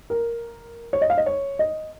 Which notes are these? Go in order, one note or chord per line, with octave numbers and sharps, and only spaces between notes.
A#4
C#5
D#5
F5
D#5
C#5
D#5